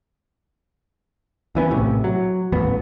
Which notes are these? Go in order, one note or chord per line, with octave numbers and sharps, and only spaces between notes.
C#2 E3 B3 C#4
A#1 A2 C3
F#3
D#1 A1 F2 B3